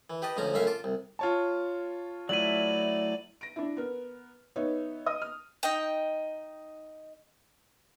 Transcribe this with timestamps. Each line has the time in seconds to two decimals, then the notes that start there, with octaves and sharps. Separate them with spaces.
0.10 E3
0.22 G4 B4 D#5 A5
0.37 D2 G#2 F3 C#4 A#5
0.54 C#2 F#2 A3 C#4 E5 F5
0.67 F4 A5 D6
0.84 C2
1.19 F4 C#5 A5
2.29 F#3 A3 E4 D5 D#7 F#7
3.41 A#6 D7
3.56 D4 E4
3.77 B3 A#4
4.56 B3 D#4 C#5 E5
5.06 D#5 D#6
5.22 F6
5.63 D#4 D#5 G5